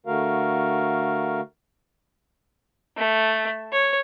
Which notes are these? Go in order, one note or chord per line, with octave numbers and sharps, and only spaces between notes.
D3 A3 F#4 A#4 F5
A3
C#5